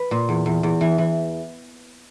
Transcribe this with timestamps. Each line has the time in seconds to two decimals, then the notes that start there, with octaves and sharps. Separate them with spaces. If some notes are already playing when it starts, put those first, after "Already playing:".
Already playing: B4
0.11 A#2
0.29 E2
0.46 E2
0.63 E2
0.81 E3
0.98 E3